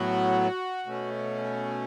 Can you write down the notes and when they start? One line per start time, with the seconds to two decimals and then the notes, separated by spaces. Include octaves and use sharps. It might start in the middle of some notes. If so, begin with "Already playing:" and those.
Already playing: A2 F#3 B3 F#4
0.86 B2 A3 C#4